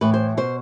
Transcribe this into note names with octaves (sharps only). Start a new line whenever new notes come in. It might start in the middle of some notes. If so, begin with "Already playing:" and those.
A2 E3 B4
C5
B2 C5